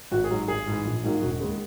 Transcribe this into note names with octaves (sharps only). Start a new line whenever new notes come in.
G#1 F#4
G#4
G#2 F#3
G#1 G#4
G#2 E3
A#1
G#2 D#3 F#3 A#3
E1 F#4
D#2 C#3 G#3